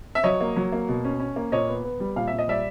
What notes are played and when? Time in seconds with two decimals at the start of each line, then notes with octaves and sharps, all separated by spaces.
0.15 E5
0.24 F#3 C#5 D#5
0.41 A#3
0.56 F#3
0.72 A#3
0.89 B2
1.05 C#4
1.20 C#4
1.36 A#3
1.52 A#2 C#5 D#5
1.69 B3
1.84 B3
2.00 G3
2.16 A#2 F5
2.28 A#2 E5
2.39 D#5
2.48 G3 D5 E5